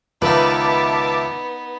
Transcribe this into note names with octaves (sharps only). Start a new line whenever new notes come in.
C#2 D#3 B3 D#4 B4 E5 A5 D6